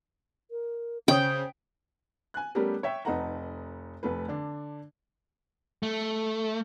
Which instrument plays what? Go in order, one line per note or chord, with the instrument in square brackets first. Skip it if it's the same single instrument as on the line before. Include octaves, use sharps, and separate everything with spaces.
[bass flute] A#4
[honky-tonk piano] C#3 C#5 D#6 [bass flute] C5 [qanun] G5
[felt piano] G#5 F#6
G3 A3 B3 C#4 G4 A#4
C#5 E5 G5
F1 D#4 A4 B4 F#5 A#5
F1 A3 B4
D3 D4
[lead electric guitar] A3